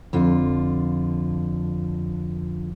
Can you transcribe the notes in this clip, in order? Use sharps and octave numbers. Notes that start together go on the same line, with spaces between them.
F2 D3 F4